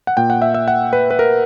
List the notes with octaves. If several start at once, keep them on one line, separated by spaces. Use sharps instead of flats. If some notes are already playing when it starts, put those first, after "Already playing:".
F#5
A#2 G5
F#5
E5
E5
F#5
B4
B4
A#4